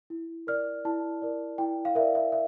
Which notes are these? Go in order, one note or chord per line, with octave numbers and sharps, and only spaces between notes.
E4
A#4 D5 F6
E4 A5
A#4 D5
E4 G5
F5
A#4 D5 E5
E5
E5